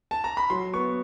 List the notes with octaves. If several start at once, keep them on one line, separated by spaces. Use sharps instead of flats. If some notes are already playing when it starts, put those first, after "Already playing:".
A5
A#5
B5
F#3 C6
B3 C#6